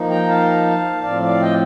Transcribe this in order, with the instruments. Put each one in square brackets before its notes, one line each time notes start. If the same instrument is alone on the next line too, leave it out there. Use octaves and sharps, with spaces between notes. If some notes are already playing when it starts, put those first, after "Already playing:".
Already playing: [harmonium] F3 A#3 D#4
G5 A#5
F5 A5
A2 F3 C4 D5 F5
D5 F5
D#5 G5